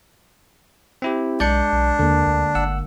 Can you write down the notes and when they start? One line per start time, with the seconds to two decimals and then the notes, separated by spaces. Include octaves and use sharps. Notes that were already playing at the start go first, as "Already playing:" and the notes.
1.02 C4 E4 G4
1.40 B1 G#3 D4 D5 G6 C#7
1.72 B1
1.99 D#2 D3 A#3
2.27 D2
2.55 G1 F#5 E6